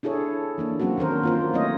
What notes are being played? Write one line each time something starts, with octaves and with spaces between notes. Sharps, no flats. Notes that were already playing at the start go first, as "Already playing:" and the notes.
D4 E4 G#4 A4 C#5
E3 A#3 D4
F#3 A#3 C4 C#4 F#4
D#3 D4 A#4 C5
A#3 F4 C5
F#3 A3 C4 E4 C#5 D#5